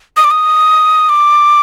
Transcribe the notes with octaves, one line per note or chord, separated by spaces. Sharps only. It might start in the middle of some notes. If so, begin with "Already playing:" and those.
D#6
D6
D#6
D6